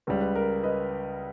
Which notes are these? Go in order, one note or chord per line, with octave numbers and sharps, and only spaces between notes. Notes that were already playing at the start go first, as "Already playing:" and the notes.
C#2 C#3 G3 B4
B4
A#4
B4 D#5